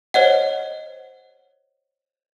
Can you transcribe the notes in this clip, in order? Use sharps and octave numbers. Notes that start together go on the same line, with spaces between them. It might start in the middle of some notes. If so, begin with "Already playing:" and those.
C5 C#5 D#5 F#5